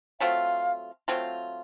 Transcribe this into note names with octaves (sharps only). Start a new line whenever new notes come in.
F#3 A3 C4 F4 F5
F#3 A3 C4 F4